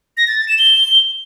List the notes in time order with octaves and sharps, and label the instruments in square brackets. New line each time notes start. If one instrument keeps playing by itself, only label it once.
[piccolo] A#6
A6
A6
E7
G7